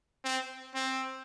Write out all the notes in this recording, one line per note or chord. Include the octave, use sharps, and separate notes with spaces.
C4
C4